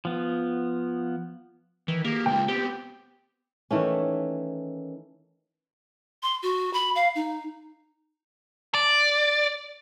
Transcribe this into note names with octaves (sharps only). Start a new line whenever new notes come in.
F3 B3
D#3 E3
A#3 G4 G#4
C#3 G#3 F4 G5
B3 C4 G4
D#3 E3 A3 C#4
C6
F#4
B5
F5
D#4
D5